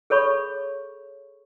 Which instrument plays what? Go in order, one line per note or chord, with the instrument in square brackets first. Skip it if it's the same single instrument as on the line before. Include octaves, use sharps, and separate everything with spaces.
[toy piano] G#4 A4 C#5 B5 C#6